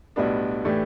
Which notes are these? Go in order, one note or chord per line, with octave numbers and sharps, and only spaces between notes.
B1 A2 G3 B3 D4
A2 E3 A3 D4 G4